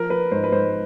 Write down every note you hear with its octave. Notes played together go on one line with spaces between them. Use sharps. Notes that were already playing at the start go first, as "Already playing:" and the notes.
Already playing: F3 A#4
F3 B4
G#2 C5
B4
G#2 C5